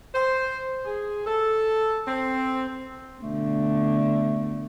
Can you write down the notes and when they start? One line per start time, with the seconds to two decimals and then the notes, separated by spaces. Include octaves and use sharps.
0.14 C5
0.85 G#4
1.25 A4
2.07 C4
3.22 B2 D3 A3